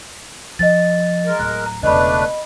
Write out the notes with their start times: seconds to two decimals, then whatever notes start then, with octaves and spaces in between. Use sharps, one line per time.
0.59 F3 D#5 A6
1.26 G#3 A#4
1.39 D1 F#6
1.66 A#5
1.83 E1 C#3 A3 D4 B4 D#5 B5